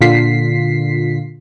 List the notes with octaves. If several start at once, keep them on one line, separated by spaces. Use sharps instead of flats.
A#2 D3 F4 B6 C7